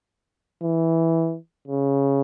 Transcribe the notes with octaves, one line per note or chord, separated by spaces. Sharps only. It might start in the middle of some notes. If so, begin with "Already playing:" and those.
E3
C#3